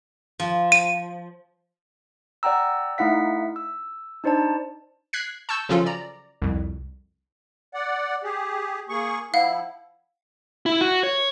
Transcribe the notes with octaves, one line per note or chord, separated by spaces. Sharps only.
F3
D#7
D5 F#5 G5 A#5 E6
A3 D#4 E4 F5 F#5 B6
E6
D4 D#4 C5 D5 A5
F#6 G#6 B6 C7
A5 C#6 E6 G6
C#3 F3 F#3 C#4 F4 A4
D5 A#5
C2 F2
D5 F#5
G4 G#4
A#3 G#4 C#6
F3 E4 F5 F#5
E4
F#4
C#5